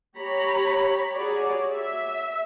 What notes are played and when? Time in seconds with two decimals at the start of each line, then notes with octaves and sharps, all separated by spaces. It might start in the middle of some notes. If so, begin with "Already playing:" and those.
0.17 G4 C#5 A#5 B5
1.13 F#4 G#4 C#5 D5
1.71 E5